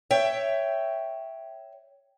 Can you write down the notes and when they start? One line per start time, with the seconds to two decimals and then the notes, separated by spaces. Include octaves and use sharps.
0.10 C#5 E5 G5